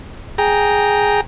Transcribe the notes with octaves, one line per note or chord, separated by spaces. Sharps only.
G#4 G5 A#5